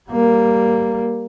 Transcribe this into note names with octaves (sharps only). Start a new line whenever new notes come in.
G3 A#3